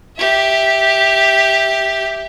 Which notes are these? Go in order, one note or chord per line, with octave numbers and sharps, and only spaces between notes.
G4 E5